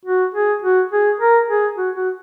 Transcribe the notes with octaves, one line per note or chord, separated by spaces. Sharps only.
F#4
G#4
F#4
G#4
A#4
G#4
F#4
F#4